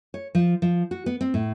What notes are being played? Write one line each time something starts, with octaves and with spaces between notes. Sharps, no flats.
C#5
F3
F3
F#4
B3
C4
A2